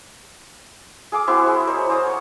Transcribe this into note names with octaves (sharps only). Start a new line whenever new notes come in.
G#4 F5 D6
C4 E4 F#4 C6
G#4
A#4 C5 C#5 D#5
C5 D5 F5 D#6
C#5 C#6